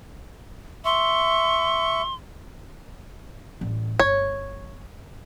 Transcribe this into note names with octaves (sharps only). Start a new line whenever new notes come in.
E5 C6 C#6
A1 G3
G1 C#5